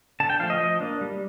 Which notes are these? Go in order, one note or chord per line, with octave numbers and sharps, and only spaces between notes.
D3 A5
G5
F3 A3 F5
D#5
F3
A#3 D4
G3